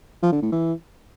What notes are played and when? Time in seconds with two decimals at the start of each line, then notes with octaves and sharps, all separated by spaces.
0.22 F3
0.32 D3
0.42 A2
0.52 E3